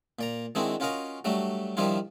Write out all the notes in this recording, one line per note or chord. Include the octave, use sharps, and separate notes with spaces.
A#2 D5 A#5
D#3 G#3 C4 D4 E4 F#4
C#4 F4 F#4 A#4 D#5 F5
F#3 G3 A3 D4 F#4
D#3 F3 G3 D4 E4 F4